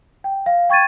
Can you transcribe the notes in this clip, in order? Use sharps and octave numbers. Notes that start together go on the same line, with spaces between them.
G5
F5
G5 C#6 G#6 A6 D#7